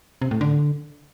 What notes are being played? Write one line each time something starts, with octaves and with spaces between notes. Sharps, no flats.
C3
A2
D3